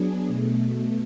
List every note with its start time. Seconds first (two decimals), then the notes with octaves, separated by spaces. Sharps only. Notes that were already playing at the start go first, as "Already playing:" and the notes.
Already playing: F#3 B3 D4 G#4
0.27 B2 A3